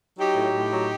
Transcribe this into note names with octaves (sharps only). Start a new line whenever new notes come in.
F#3 D#4 G4
A2
A2
F#3